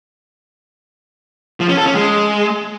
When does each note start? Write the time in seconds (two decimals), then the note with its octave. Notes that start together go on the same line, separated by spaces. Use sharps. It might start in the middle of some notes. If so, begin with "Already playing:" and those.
1.60 F3
1.69 C#4
1.77 A4
1.86 C#4
1.94 G#3